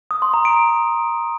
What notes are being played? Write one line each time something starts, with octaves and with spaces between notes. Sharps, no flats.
D#6
C6
A#5
D7